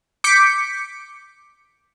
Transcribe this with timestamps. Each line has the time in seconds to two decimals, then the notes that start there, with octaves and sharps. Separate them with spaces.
0.24 D6 G6 B6 C#7 D7